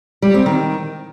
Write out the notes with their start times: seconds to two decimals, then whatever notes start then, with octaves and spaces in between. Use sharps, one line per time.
0.22 G3
0.34 C4
0.46 D#3